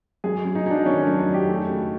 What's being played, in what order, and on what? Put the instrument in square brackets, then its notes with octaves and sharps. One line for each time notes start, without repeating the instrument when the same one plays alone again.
[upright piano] F#2 [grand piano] G#4
[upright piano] F#2
[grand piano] D#4
[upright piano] F#3 [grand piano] D#4
[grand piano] D4
[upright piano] D#3 [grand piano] C#4
[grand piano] D4
[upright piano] F#2
[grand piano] D#4
[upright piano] F#2
[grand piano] G4
[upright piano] A3
C#3